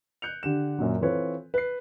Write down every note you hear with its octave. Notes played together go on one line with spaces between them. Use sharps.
F#6 G6 C#7 F7
D3 G4 E7
F#2 A#2 F#3
E3 C4 F4 A4 B4 C#5
B4 C7